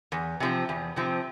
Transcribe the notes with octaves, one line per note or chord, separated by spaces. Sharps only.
E2
C3 F3 C4
E2
C3 F3 C4